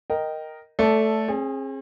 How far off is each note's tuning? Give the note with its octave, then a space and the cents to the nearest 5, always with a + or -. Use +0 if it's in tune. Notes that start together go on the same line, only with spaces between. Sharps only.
A#4 +0 D#5 +0 G5 -10
A3 -5 A4 +0 D5 -30
C4 +45 G#4 +0